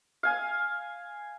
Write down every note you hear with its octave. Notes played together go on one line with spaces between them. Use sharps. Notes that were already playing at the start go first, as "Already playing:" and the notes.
F5 G#5